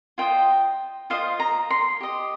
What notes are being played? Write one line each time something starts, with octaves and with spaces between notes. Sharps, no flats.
F4 C5 D#5 G5
F4 C5 D#5 F5
A#5
C6
G4 D#5